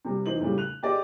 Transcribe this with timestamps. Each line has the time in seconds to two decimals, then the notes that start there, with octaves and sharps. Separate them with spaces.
0.05 C3 G3
0.26 E3 D#4 C5 F#7
0.40 A2 C#3 G3
0.58 F#6 F7
0.83 G4 G#4 D5 D#5